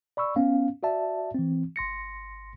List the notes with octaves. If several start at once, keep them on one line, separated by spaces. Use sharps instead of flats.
D5 B5 C#6 E6
B3 C#4 F5
F#4 D5 E5 A5
E3 C4
G#1 C6 A#6 C#7